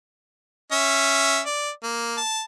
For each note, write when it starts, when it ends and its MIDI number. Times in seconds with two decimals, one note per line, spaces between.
0.72 1.40 61
0.72 1.40 76
1.46 1.70 74
1.83 2.16 58
2.17 2.42 81